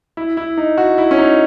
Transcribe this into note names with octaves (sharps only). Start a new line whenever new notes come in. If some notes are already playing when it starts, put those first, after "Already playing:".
E4
E4
D#4
F#4
E4
C#4
D#4